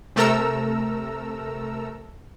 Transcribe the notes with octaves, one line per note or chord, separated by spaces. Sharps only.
C3 A3 A4 A#4 A#5 E6